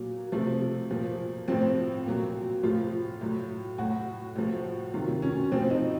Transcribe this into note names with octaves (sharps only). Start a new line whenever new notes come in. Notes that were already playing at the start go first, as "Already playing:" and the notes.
Already playing: A#2 F#3
C3 F3 A3
A#2 F3
A2 F3 C4
A#2 F#3
A2 F3 F4
A2 F#3
A2 F#3 F#4
A2 F3
C3 D#3 F#3 F4
C#4
A2 F3 C4
D#4